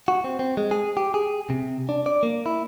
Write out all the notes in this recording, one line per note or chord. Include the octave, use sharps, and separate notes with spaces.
F#4
C4
C4
G#3
G#4
G4
G#4
C3
D4
D5
A#3
E4